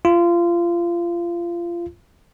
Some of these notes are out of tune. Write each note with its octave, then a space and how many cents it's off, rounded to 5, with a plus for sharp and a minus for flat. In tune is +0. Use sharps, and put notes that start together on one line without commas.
F4 -25